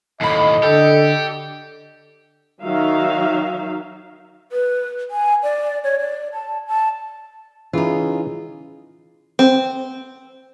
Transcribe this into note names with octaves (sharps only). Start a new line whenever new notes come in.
D#2 A2 D#5 B5 C7
D3 G4 A4
D#3 F#3 D#4 E5 F5
B4
G#5
D5
C#5
D5
A5
A5
C#3 E3 D#4 F4
C4